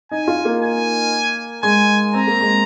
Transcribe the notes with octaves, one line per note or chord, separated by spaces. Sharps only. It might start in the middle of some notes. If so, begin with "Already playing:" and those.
D#4 G#5
F4
A#3
G#5
G#3 G#5
C4 A#5
A#3
G#3